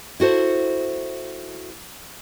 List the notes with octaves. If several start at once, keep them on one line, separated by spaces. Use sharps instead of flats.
E4 F#4 A4 C5